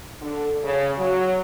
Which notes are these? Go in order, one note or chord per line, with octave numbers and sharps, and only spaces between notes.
D3
C#3
F#3